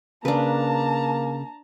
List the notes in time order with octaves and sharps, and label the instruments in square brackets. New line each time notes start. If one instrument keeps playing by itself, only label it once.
[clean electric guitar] C#3 [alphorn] A#3 [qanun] D4 B4 [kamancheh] A5 A#5